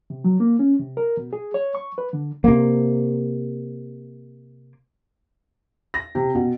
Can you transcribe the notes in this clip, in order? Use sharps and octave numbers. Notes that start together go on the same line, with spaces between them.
C3
F#3
A#3
C#4
C3
A#4
B2
G#4
C#5
C#6
B4
D3
C3 A#3
A#6
C3
B2